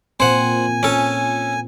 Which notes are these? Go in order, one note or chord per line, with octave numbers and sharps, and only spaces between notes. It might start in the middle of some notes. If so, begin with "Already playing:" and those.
A#2 C4 C5 F#5 G#5
C#4 A4